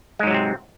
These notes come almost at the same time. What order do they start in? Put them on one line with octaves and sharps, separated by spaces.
G#3 G#2 F#3 C3 C4